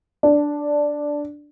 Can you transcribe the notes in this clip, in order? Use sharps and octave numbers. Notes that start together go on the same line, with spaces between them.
D4